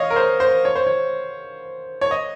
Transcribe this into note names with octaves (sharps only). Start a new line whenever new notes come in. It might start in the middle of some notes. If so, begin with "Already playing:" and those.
Already playing: C#5 D#5 F5
A#4
C5
C5
C#5
C5
C#5
C#5
D#5